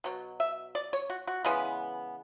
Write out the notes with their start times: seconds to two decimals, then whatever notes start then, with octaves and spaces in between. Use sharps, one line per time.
0.04 B2 F#3
0.40 E5
0.75 D5
0.93 C#5
1.10 F#4
1.27 F#4
1.45 C#3 E3 G#3 B3